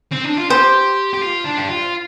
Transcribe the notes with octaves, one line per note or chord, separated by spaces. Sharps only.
C4
D4
F4
G4 C5
G4
F4
D4
G4
F4